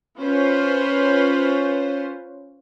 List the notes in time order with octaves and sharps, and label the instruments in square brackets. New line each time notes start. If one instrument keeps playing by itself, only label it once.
[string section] C#4 F4 B4 C5